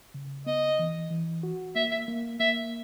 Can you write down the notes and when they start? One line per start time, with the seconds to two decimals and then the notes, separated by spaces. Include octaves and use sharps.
0.14 C#3
0.46 B3 D#5
0.79 E3
1.11 E3
1.43 F#4
1.75 A#3 E5
1.91 E5
2.08 A#3
2.40 A#3 E5